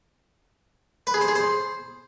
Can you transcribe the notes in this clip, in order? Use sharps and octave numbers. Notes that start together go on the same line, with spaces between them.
B4
G#4
C5
G#4
C5